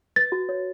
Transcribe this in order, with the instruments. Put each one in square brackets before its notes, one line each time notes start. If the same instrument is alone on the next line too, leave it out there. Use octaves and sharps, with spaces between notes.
[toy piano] B4 [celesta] A6
[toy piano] F#4
C#5